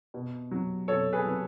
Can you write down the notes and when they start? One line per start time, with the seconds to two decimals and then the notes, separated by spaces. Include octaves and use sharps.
0.14 B2
0.51 F#3
0.88 B2 A4 C#5
1.13 G#4 B4
1.25 F#3 B4